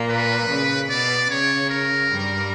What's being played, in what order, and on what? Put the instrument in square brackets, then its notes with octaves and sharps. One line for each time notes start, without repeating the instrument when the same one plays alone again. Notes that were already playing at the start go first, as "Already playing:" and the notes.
Already playing: [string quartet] A#2 A#3
[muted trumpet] B4
[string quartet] C#3
[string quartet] B2 [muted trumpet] D5
[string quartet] C#3 [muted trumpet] C#5
[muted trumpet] A#4
[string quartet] G2 G3